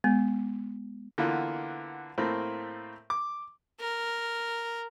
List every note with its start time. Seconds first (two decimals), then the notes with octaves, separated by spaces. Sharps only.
0.04 G#3 B3
1.18 D3 E3 A#3 B3 F4
2.18 A2 A3 A#3 C4
3.10 D6
3.80 A#4